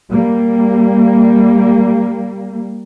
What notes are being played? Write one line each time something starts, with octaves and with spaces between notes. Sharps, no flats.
G3 A#3